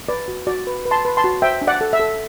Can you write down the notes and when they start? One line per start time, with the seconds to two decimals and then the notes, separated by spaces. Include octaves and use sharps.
0.09 B4 D5
0.28 F#4
0.47 F#4 D5
0.67 B4
0.85 B4
0.91 A5 C6
1.05 B4
1.17 A5 C6
1.24 F#4
1.42 C5 E5 G5
1.62 D4
1.67 D5 F#5
1.81 A4
1.93 E5
2.00 A4